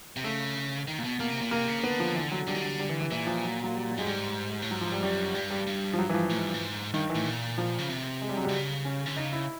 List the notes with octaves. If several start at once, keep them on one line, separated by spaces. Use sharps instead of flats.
C3
C#3 A3
D#3
A#2
B2
B2 A#3
C3
A#2
C3 A#3
C#3
D3 B3
F3
E3
F#3
D3 G3
D#3
D3
G3
E3
E3
A#2 E3
F3
F#3
F#3
G3
F#3
G2 G#3
G#2 G3
A2
G#2 F#3
F3
G3
F#2 G3
G2 G3
G3
G2
F3
F#3
E3
F3
A2
G#2
G2
G#2
G2 D#3
E3
A2
A#2
F3
C#3
C3
G#3
G3
F#3
C3 G3
C#3
C#4
D3
C#3 D#4
E4